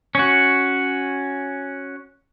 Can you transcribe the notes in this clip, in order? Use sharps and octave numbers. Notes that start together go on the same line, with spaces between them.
C#4 F#4